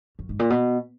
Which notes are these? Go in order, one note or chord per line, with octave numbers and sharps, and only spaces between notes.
F#2
G#2
A#2
B2